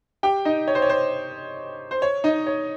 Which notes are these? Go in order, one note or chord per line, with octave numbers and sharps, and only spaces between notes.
G4 G5
D#4 D#5
C#5
C5
C#5
C5
C5
C#5
D#4 D#5
C#5